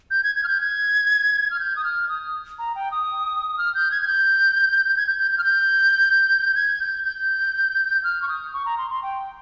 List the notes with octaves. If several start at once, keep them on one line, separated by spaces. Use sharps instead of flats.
G6
G#6
G#6
F6
G6
G#6
F6
G6
D#6
F6
D#6
A#5
G5
D#6
F6
G6
G#6
G#6
G6
G#6
G6
G6
G6
F6
G6
G#6
G6
G6
F6
C#6
D#6
C#6
A#5
C6
C6
G5